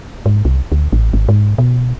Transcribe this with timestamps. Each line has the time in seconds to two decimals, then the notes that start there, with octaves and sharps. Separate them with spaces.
0.26 G#2
0.45 C2
0.72 D2
0.93 A1
1.13 G#1
1.29 G#2
1.58 B2